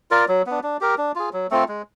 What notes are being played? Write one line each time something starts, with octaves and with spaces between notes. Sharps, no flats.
F4 A#4 D5
F#3
B3 D4
D4
G4 A#4
D4
F4 G#4
F#3
A3 C4 F4
G#3